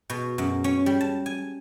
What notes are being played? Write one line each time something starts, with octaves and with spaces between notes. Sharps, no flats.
B2
F#2
C#4
G3
A5
G#5